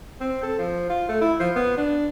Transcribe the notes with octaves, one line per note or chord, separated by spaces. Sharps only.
C4
A4
F3
F4
A3
E4
F3
B3
D4